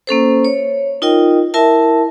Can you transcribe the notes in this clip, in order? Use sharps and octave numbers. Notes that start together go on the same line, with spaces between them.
A#3 C#4 A4 C5
C#5
D#4 F4 A#4 D#5 G5
E4 A#4 E5 A5